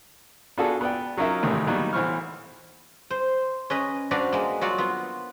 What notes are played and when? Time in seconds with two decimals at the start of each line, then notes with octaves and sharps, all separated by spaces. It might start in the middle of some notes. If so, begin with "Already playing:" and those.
0.58 B3 D4 F4 F#4 G#4 A4
0.81 B3 B4 D5 G5
1.17 F#3 C#4 D#4 F4 A#4 E5
1.43 G#1 A2 C3 D#3 E3
1.67 D#3 F#3 G3 A#3 B3 D#4
1.93 B1 E3 C5 C#6 F6
3.10 C5
3.70 C#4 B4 D#5
4.11 C4 D4 F#4 B4 D5 F5
4.33 G#3 A#3
4.61 F#3 F4 F#4 D5
4.78 B3 F4